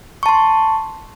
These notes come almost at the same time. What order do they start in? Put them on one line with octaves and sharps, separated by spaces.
C#6 A5 C6